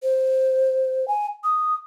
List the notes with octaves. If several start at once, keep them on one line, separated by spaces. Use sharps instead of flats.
C5
G#5
D#6